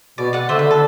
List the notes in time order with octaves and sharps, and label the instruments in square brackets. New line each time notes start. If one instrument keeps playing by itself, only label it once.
[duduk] B2 [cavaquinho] D5
[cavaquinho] D5 F#5
[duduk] D3 [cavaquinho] C5 E5
[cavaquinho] B4
[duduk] D3
[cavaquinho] A4